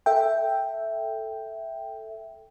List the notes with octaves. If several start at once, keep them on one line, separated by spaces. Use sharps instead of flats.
A4 E5 G5